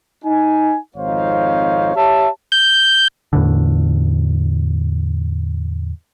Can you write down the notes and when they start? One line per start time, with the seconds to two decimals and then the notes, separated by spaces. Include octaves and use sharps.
0.25 D#4 G#5
0.97 G#1 F2 D#4 C5 C#5 F5
1.96 G4 C#5 E5 A5
2.52 G6
3.33 E2 A2 D3